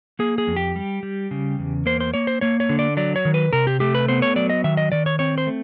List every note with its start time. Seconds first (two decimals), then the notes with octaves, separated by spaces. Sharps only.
0.19 A#3 G#4
0.38 G#4
0.47 F2
0.56 G4
0.76 G3
1.03 G3
1.31 C#3
1.59 E2
1.86 A#3 C5
2.00 C5
2.14 A#3 C#5
2.27 C5
2.41 A#3 C#5
2.60 C#5
2.69 D3
2.79 D5
2.97 F#3 D5
3.16 C#5
3.25 D#3
3.34 B4
3.53 C3 A#4
3.67 G4
3.80 A3 G4
3.95 B4
4.08 B3 C5
4.22 C#5
4.36 F#3 D5
4.50 D#5
4.64 D#3 E5
4.77 D#5
4.92 D#3 D5
5.06 C#5
5.19 C4 C#5
5.38 C5
5.47 A3